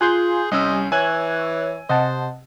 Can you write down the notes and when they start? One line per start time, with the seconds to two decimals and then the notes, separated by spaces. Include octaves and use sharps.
0.01 F4 G#4 G#5 C6 F#6 G6
0.51 C2 G3 C#4 D#5 E6
0.92 E3 C#5 G#5 E6 F#6 G#6
1.89 C3 C5 D#5 F#5 A5